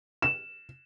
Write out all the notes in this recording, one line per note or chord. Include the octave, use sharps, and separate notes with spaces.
E7